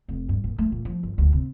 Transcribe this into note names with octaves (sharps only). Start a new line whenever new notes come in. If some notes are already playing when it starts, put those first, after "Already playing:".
F1
G2
A#2
A3
A#2
F3
G1
D2
C3